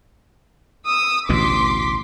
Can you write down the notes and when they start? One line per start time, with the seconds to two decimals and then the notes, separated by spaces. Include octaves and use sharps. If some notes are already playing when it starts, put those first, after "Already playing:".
0.87 D#6 E6
1.29 A1 D2 B2 C6 D6 B6